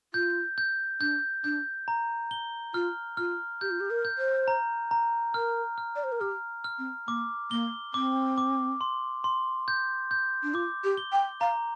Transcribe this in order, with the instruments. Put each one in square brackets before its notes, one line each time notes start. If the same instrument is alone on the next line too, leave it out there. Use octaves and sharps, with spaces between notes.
[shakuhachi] F4 [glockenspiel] G6
[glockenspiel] G6
[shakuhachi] D4 [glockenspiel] G6
[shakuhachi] D4 [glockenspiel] G6
[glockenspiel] A#5
G7
[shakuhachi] F4 [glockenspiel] F6
[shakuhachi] F4 [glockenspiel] F6
[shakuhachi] G4 [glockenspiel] G6
[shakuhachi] F4
G4
A#4
[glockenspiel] G6
[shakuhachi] C5
[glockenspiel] A#5
A#5
[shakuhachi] A#4 [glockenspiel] F6
[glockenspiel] F6
[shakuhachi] D5
C5
A#4
[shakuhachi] G4 [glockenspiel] F6
[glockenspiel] F6
[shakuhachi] C4
[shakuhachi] A#3 [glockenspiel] D6
[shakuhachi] A#3 [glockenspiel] G7
[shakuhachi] C4 [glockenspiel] D6
[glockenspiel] D6
C6
C6
G6
G6
[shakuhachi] D4
[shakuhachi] F4 [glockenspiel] D6
[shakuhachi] G4
[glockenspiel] G7
[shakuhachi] G5
[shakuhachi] F5 [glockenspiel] A#5